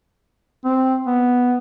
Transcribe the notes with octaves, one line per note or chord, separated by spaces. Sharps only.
C4
B3